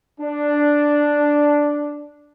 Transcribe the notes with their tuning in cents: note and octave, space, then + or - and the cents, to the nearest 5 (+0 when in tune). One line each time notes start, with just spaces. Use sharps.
D4 +0